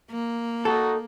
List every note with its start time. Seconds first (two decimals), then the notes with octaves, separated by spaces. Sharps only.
0.11 A#3
0.65 D#4 F#4 A4